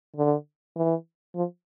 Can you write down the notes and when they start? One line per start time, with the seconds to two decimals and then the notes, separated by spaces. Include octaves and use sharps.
0.16 D3
0.76 E3
1.35 F3